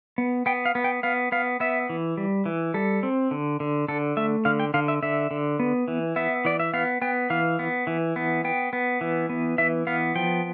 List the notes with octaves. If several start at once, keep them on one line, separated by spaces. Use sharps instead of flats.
B3
B3 G5
F5
B3
G5
B3 F5
B3 F5
B3 E5
E3
G3
E3
G3 A4
C4
D3
D3
D3 A4
A3 E5
D3 F5
G5
D3 F5
E5
D3 E5
D3
B3
E3
B3 E5
E3 D5
E5
B3 F5
B3 G5
E3 F5
B3
E3
B3
B3 G5
B3
E3
B3
E3 E5
B3 F5
F3 G5